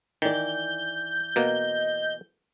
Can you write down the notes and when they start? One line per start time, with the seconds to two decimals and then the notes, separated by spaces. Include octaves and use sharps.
0.22 D#3 E3 D5 G6
1.36 B2 A#3 D#5